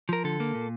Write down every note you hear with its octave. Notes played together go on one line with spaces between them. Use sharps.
F3 A#4
D3 A4
A#3
A#2